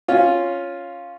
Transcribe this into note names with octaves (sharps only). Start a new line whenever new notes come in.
C#4 F4